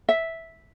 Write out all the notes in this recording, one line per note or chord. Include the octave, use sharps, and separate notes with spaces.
E5